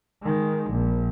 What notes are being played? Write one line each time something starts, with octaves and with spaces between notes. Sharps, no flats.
D#3 G#3
A#1